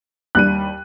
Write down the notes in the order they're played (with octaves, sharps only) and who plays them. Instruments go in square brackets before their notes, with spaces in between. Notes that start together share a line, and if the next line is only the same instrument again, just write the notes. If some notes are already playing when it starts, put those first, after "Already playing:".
[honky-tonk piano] D#2 G3 D#7 [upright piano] F#6